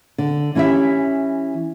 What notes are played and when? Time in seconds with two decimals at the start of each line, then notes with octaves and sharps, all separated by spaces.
0.18 D3
0.55 E3 C#4 E4 G4 E5